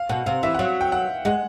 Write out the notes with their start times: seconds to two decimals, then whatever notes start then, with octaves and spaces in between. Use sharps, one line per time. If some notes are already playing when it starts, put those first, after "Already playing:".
Already playing: F5
0.09 B2 F#5
0.26 C3 F5
0.43 E3 E5
0.55 F#5
0.59 F#3 F5
0.81 G5
0.92 F#5
1.25 G#3 F#5